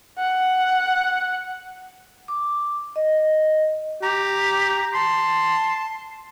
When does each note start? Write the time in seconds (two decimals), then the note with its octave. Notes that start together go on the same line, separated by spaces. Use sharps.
0.18 F#5
2.28 D6
2.96 D#5
4.02 G4 A#5
4.94 A5 C6